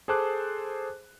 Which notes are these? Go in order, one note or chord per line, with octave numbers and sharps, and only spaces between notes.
G#4 A4 C5 A5 D6 F#6